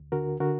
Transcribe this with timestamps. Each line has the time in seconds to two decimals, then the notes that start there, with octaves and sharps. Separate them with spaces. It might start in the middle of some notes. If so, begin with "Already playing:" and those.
Already playing: D2
0.12 D3 F#4 A#4
0.40 D3 F#4 A#4